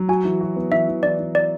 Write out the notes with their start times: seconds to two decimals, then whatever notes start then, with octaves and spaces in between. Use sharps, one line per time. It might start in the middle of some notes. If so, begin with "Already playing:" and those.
Already playing: F#3
0.09 F#4 G#5
0.25 E3
0.40 F#4
0.56 B3
0.72 E3 E5
0.88 E3
1.03 E3 D5
1.19 E3
1.35 D5